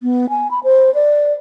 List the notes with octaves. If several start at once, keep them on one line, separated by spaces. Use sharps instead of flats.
B3
G#5
B5
C5
D5